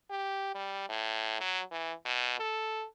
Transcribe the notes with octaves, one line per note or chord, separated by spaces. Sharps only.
G4
G3
A2
F#3
E3
B2
A4